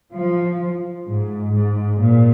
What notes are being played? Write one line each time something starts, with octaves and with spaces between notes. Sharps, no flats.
F3
G#2
G#2
A#2